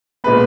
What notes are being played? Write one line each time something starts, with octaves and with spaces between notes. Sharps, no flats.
A#2 G#3 B3 B4